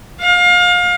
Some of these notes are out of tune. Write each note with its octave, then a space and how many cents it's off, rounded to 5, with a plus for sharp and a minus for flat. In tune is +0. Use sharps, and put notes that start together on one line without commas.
F5 +30